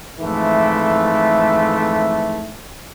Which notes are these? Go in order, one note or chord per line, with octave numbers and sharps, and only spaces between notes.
F2 G#2 E3 A3